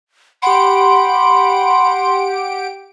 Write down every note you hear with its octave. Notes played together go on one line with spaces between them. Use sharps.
G4 F#5 B5 C6 D7